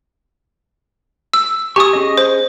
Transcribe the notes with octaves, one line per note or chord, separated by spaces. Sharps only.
E6
G4 G#5 C#6 D#6
C#4 G#4 D#5
C5